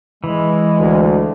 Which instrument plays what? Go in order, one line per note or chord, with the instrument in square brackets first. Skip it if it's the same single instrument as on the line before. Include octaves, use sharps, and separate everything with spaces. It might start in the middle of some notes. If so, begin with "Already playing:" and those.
[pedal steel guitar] E3 [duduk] G#3
[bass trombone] D2